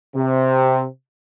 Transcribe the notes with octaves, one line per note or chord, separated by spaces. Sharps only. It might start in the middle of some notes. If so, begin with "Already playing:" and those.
C3